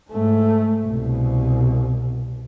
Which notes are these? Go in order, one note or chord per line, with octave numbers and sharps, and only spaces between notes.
G#2 A3
C2 B2